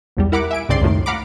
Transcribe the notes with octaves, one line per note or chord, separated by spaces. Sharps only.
B1 E2 G3
E4 A#4 F#5 B5 D6
E5 G#5 D7
C2 G2 C#3 C4 D5 C6
C#2 F#2 A2 D#3
F5 F#5 A#5 B5 D6